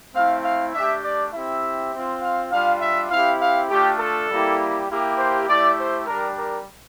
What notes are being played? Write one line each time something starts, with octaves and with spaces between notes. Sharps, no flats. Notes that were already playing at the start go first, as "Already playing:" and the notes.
A3 C4 E4 F5
F5
A3 D4 G4 E5
D5
C4 E4 G4 E5
C4 F4
F5
G3 D4 F4 F5
E5
C4 E4 G4 F5
F5
A3 D4 F4 G4
A4
G3 A#3 E4 G4
A#3 E4 G4
C5
A3 E4 G4 D5
C5
G3 D4 G4 A#4
A#4